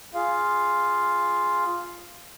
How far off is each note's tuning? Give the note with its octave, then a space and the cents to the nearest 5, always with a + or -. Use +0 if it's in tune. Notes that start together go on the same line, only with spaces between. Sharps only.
F4 +0 G#4 +0 F5 +0